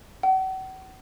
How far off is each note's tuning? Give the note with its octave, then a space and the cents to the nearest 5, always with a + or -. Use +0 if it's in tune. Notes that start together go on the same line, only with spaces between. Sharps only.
F#5 +40